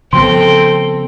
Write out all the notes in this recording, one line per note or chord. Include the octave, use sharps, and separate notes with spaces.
C#3 F3 B3 C4 A4 G5 C6